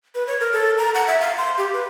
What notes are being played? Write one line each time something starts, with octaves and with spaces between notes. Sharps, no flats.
B4
C#5
A#4
A4
A#5
F#5
E5
F5
C6
G4
B4